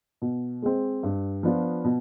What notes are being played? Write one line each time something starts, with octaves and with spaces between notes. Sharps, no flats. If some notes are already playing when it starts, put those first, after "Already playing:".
B2
G#3 C4
G2
F3 B3 D4 F4
B2